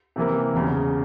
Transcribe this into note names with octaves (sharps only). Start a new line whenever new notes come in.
C3 E3 A#3 E4
E1 E2 C#3